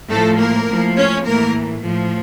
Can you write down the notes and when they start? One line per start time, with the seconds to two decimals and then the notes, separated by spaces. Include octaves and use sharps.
0.09 A2 F3 A3 A4
0.38 A#3 A#4
0.68 A2 F3
0.96 C#4 C#5
1.25 A2 E3 A#3 A#4
1.83 A2 F3